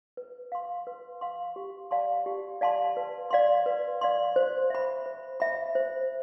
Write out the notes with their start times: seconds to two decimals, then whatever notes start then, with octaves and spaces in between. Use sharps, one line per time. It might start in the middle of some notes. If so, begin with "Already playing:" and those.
0.17 B4
0.52 F5 C6
0.87 B4
1.21 F5 C6
1.56 G4
1.91 D5 F5 A5 C6
2.26 G4
2.61 D5 F5 A5 C6
2.97 B4
3.31 D5 F5 C6
3.66 B4
4.01 D5 F5 C6
4.36 C5
4.70 E5 B5
5.06 C5
5.40 E5 B5
5.75 C5